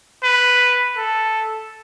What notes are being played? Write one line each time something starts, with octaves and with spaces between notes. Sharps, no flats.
B4
A4